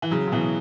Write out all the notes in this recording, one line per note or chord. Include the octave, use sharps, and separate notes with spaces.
E3
C#3 F#3
C#3
B2 E3